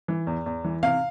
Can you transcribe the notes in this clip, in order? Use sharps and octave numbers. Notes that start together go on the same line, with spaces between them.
E3
E2
E2
E3
C3 F5